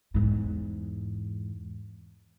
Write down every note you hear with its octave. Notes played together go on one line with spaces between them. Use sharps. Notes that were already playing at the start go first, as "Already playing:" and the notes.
E2 G#2